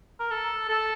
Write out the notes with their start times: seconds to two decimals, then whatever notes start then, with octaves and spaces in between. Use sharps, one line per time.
0.20 A#4
0.31 A4
0.69 A4